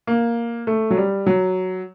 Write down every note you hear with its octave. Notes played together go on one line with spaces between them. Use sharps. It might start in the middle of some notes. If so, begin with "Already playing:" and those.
A#3
A3
F#3
G3
F#3